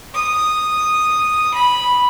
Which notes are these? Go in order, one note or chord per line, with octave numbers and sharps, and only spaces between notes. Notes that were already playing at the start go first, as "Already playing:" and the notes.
D#6
B5